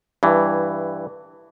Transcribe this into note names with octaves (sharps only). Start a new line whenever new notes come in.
G2 E3